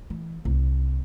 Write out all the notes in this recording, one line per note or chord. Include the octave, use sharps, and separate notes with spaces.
E3
C2